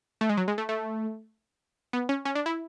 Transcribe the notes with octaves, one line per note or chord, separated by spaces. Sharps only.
A3
G#3
F#3
G#3
A3
A3
B3
C#4
C#4
D4
E4